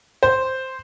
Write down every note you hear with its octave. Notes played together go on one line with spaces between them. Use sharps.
C5